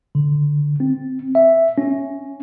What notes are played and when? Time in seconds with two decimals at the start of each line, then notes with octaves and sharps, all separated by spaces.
0.15 D3
0.80 C4
1.35 E5
1.78 C#4